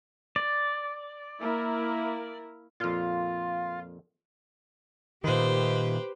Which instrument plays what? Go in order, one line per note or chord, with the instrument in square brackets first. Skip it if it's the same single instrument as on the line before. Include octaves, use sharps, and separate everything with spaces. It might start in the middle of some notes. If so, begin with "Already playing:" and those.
[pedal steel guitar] D5
[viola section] A#3 E4 A#4
[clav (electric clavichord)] F2 A#2 [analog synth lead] F4
[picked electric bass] A#2 D#3 [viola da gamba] G4 B4 C5